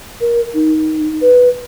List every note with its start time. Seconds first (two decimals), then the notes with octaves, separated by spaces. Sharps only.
0.21 A#4
0.54 D#4
1.21 B4